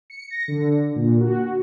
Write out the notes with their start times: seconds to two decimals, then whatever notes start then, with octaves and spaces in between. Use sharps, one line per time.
0.10 C#7
0.30 A#6
0.48 D3
0.96 A#2
1.20 F#4